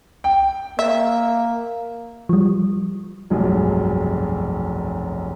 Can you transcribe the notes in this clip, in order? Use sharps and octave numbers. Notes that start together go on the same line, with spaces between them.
G5
A#3 E5
F3 G3
F1 B1 G2 F#3 G#4